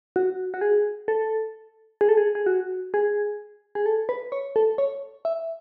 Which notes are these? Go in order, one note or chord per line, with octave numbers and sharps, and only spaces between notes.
F#4
F#4
G#4
A4
G#4
A4
G#4
G#4
F#4
G#4
G#4
A4
B4
C#5
A4
C#5
E5